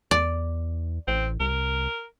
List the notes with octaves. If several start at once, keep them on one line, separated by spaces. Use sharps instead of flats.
E2 D5
A1 C4
C2 A#4